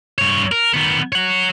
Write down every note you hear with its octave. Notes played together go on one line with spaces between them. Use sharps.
G2 C#5
A#4
D#3 B3
C#5 F#5